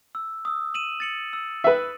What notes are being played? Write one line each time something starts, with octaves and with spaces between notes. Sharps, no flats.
E6
D#6 E6
D#7 E7 F#7
A6 C#7 F#7
E6
B4 E5